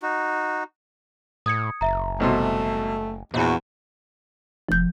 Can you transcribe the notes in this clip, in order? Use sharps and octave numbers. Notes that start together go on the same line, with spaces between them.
D#4 F#4
A2 D#6 G#6 C#7
F#1 E5 A#5
C2 B2 A3 C6
A#1 E2 F#4
F1 F3 G6